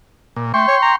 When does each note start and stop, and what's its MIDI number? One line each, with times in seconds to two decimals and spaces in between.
0.36 0.52 46
0.54 0.64 57
0.54 0.96 79
0.54 0.96 84
0.54 0.96 85
0.68 0.77 73
0.82 0.93 82